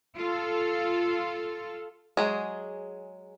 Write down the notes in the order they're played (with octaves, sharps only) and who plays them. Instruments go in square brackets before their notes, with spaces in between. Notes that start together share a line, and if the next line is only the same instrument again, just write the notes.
[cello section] F4 A4
[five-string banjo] F#3 G#3 G#4